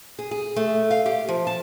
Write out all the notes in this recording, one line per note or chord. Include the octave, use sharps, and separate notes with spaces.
G#4
G#4
A3
F5
G4
F3
A5